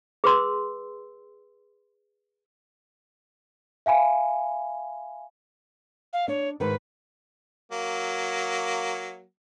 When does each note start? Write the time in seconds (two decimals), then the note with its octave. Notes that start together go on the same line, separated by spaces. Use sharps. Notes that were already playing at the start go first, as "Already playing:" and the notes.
0.24 G#4 B4 C6 E6
3.86 E5 F5 G#5 B5
6.13 F5
6.28 D4 C#5
6.60 G#2 D#3 B4
7.72 F#3 A#3